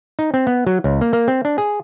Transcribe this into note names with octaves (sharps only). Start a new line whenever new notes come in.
D#4
C4
B3
F#3
C#2
A#3
A#3
C4
D4
G#4